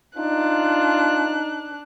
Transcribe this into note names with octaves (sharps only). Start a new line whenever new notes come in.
D4 D#4 F4 F#6